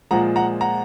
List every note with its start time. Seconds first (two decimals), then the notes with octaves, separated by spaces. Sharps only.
0.11 A#2 F3 G#3 F#5 A#5
0.36 F#5 A#5
0.61 F#5 A#5